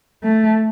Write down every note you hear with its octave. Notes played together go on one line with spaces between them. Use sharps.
A3